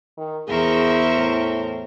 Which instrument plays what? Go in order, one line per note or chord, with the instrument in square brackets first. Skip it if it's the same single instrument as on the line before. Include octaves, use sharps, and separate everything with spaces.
[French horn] D#3
[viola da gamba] E2 A#4 C5 [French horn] G#4 [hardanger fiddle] E5 C#6
[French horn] A2